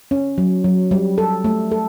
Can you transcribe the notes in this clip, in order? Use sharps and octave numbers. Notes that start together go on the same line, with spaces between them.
C#4
F#3
F#3
G3
A4
A3
A4